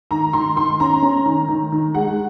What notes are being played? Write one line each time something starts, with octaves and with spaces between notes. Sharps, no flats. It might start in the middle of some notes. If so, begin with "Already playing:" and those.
D#3 A#5
D#3 C6
D#3 C6
C#4 A#5
C#4
D#3
D#3
D#3
G#3 F#5